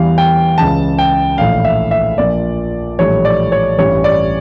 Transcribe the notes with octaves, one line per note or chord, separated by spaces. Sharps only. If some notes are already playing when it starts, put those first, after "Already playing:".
Already playing: E2 E3 G3 F5
G5
C#2 C#3 E3 A5
G5
A#1 A2 E3 F5
E5
E5
A#1 A#2 F3 D5
A#1 A2 E3 G3 C#5
D5
C#5
A1 G2 E3 G3 C#5
D5